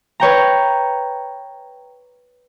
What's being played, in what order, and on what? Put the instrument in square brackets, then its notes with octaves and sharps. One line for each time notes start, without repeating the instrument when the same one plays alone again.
[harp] B4 C#5 G5 A#5